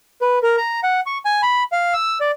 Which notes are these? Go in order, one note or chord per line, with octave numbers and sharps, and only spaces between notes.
B4
A#4
A#5
F#5
C#6
G#5
B5
F5
E6
D5